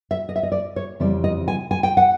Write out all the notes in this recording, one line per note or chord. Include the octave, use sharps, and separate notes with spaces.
E5
D#5
E5
D#5
D5
C#5
F2 C#3 E3 G3 C4 D5
D#5
G#5
G#5
G5
F#5